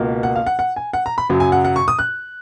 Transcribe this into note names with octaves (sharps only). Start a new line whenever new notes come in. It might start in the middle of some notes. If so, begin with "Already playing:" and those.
Already playing: C#2 B2 A#3
F#5
F5
F#5
F#5
G#5
F#5
A#5
B5
F#2 C#3 F#3
G#5
F#5
F#5
C#6
D#6
F#6